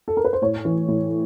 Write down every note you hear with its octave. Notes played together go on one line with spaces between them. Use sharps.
A4
A#4
B4
C5
A2 C#5
E3
A2